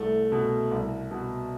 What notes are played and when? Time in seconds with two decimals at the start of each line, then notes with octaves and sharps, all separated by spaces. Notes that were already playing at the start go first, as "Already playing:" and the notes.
Already playing: C2 A3
0.32 B2
0.71 C2
1.11 B2